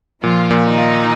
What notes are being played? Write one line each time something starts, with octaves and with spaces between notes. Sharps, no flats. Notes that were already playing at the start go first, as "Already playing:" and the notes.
A#2 F3 F4
A#2
D#3 D#4
F4